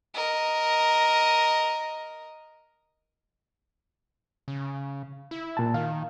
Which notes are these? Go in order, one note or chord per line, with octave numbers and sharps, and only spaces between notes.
A#4 D#5
C#3
E4
A#2 A5
D#3 F5